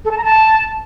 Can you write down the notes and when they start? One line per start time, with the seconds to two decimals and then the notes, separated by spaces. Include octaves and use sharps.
0.04 A4
0.11 A5
0.17 A#5
0.24 A5